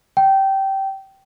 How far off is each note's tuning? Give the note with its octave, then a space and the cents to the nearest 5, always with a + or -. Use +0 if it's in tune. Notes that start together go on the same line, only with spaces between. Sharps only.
G5 -15